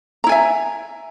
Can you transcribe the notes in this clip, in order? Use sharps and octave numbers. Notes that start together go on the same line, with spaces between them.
E4 E5 G#5 A#5